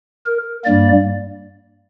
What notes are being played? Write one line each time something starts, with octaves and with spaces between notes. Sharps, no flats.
A#4
G2 G3 A#3 D5